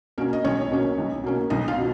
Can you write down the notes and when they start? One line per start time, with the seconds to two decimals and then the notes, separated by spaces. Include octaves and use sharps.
0.18 B2 A#3 C#4 A#4
0.33 D#5
0.44 B1 C#4 C#5
0.71 B2 A#3 C#4
0.98 B1
1.24 B2 A#3 C#4
1.50 B1 D#4 D#5
1.68 F4 F5
1.77 B2